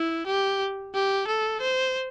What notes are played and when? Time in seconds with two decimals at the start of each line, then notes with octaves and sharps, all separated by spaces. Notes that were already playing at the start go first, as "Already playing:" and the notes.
Already playing: E4
0.27 G4
0.94 G4
1.28 A4
1.61 C5